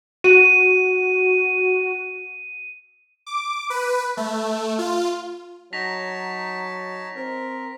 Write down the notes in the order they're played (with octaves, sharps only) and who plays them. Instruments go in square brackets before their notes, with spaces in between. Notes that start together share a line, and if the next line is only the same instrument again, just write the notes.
[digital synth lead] F#4 [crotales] D#7
[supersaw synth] D6
B4
A3
F4
[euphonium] F#3 [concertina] D#4 C#5 A5 [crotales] A#6 B6 F7
[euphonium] C4 [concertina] A#4